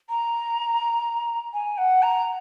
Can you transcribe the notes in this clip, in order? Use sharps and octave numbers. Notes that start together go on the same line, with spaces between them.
A#5
G#5
F#5
A#5